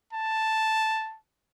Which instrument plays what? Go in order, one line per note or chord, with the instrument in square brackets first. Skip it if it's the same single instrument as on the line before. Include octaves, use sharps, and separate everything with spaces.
[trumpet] A5